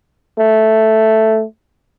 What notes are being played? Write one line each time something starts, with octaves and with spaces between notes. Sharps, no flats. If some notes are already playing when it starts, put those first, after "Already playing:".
A3